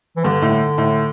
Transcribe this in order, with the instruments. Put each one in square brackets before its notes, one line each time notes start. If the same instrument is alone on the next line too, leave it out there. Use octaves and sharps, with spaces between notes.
[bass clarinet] E3
[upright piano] G2 [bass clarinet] D3
[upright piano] A2
A2